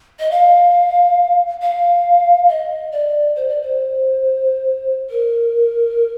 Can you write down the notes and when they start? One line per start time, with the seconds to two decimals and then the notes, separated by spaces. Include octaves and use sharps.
0.20 D#5
0.31 F5
1.62 F5
2.48 D#5
2.92 D5
3.36 C5
3.48 D5
3.62 C5
5.10 A#4